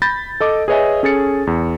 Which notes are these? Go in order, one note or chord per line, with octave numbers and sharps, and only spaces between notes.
B5 G6 A6 A#6
A4 D#5 D6
G#4 B4 C#5 D#5 E5 G#5
C#4 G#4 A4 A6 C#7
E2